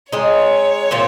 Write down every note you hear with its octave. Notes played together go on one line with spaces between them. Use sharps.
G#3 C4 D#4 C#5
A#2 F3 C4